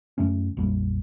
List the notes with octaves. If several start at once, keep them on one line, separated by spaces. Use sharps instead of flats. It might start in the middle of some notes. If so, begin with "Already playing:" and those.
F#2 C#3 A3 C#4
A#1 F2 G3 A#3